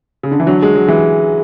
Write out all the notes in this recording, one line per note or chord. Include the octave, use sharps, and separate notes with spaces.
C#3
D3
E3
D3 F#3
G#3
F#3
E3 G#3